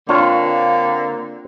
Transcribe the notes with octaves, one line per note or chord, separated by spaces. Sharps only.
D3 A#3 C4 D4 F4 C#5 F5 G5